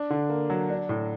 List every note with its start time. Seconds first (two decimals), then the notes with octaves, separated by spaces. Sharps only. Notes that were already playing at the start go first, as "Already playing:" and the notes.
Already playing: D4
0.10 D3
0.30 A#3
0.50 F#3
0.70 D4
0.89 A2